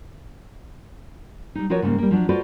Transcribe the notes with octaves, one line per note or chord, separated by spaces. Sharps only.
G3 D#4
F3 F4 F#4 A#4 B4 C#5
G#2 C#3 G3 G#3 A#3
G3 A#3
F3 F#3 D4
F4 F#4 A4 B4 C5 D5